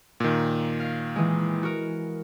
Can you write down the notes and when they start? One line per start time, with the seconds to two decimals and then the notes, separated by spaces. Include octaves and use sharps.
0.20 A#2 D#3
0.80 F5
1.16 E3 G#3
1.63 F#4 A#4